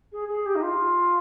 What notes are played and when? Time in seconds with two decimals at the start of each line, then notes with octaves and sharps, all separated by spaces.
0.12 G#4
0.29 G#4
0.46 G4
0.55 D#4
0.63 F4